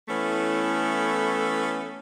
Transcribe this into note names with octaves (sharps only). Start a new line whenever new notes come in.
E3 A3 B3 C#4 E4 A4